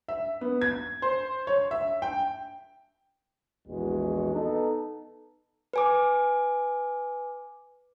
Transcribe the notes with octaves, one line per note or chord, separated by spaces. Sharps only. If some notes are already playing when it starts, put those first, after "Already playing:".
E5
B3
G#6
C5
C#5
E5
G5
A#1 E2 E3 G#3 F#4
B3 D#4 A4
B4 G#5 D6